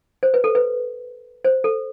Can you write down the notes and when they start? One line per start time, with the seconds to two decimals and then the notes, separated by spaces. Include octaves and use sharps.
0.23 C5
0.34 B4
0.44 A4
0.55 B4
1.45 C5
1.64 A4